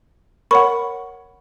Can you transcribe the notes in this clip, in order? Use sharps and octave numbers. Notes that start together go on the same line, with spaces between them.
A#4 C#5 F#5 B5 C#6